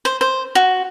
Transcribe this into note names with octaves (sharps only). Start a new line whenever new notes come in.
C5
C5
F#4